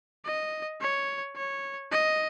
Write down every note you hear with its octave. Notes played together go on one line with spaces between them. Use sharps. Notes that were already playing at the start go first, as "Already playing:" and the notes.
D#5
C#5
C#5
D#5